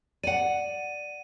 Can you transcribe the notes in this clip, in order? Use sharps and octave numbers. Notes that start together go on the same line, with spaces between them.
D5 F#5 D#7